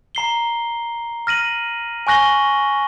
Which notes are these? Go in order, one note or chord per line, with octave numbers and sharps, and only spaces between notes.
A#5 C7 G7
F6 A#6 D#7 F#7
G#5 C#6 F#6 A#6 F#7 G7